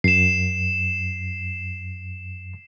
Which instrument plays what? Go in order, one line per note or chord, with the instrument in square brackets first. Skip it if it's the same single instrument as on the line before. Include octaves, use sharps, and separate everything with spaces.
[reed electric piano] F#2 [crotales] C7 E7